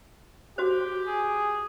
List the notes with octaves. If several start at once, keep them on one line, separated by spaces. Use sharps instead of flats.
F#4 G4 C5
G#4